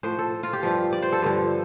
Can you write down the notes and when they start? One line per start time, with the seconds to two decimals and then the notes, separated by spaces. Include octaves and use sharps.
0.03 A2 F3 C5
0.19 A4
0.43 F4
0.53 G4
0.63 G2 F3
0.93 D5
1.02 C5
1.13 A4
1.22 G2 D3 F3